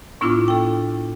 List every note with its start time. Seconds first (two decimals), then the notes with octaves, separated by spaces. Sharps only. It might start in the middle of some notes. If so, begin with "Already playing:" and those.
0.21 A2 B3 D4 E4 F4 D6
0.48 A4 G5